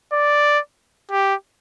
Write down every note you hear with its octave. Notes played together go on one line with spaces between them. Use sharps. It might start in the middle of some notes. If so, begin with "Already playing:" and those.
D5
G4